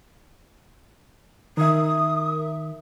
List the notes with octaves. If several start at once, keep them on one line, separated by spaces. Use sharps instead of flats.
D#3 A#4 E5 D#6